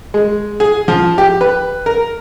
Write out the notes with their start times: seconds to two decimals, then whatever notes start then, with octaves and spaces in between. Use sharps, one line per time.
0.14 G#3
0.60 G#4
0.88 F3
1.18 G4
1.41 B4
1.86 A#4